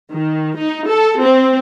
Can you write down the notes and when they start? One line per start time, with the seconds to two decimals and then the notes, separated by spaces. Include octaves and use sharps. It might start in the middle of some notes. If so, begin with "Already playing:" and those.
0.12 D#3
0.57 D#4
0.88 A4
1.21 C4